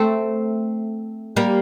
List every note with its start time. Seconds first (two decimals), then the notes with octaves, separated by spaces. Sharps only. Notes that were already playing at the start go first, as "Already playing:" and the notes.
Already playing: A3 C4
1.36 G3 A#3